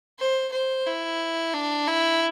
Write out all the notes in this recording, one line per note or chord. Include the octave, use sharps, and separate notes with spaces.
C5
C5
E4
D4
E4